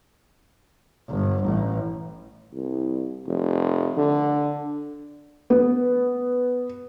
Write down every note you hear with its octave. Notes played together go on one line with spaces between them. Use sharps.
G1
A1
C2
F1
D3
B3